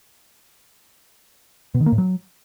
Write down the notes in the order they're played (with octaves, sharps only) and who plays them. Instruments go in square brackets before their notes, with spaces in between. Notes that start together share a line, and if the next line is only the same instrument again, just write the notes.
[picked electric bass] B2
D#3
A#3
A2
F#3